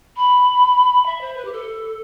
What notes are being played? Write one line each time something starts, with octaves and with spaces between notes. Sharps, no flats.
B5
E5
C5
B4
G4
A4